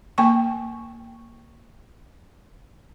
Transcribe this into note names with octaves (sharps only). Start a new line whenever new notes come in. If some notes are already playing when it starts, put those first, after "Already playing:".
A#3 G5 C#6